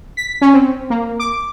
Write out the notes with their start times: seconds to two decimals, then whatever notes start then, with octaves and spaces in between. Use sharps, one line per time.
0.17 B6
0.41 C#4
0.54 C4
0.90 A#3
1.20 D6